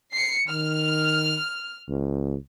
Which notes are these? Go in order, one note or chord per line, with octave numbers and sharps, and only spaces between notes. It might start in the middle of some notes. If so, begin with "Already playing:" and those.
C7 C#7
D#3 F6
C#2